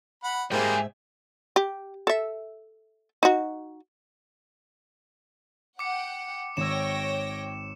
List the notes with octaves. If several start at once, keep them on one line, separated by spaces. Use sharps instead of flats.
F#5 B5
G#2 G3 G#3 A#3 G#4 E5 G5
G4
A4 E5
D#4 F#4
F#5 G5 D6 C#7
G#1 C#5 G5 E6 A#6 E7